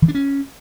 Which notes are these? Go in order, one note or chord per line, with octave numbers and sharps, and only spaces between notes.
E3
D4
C#4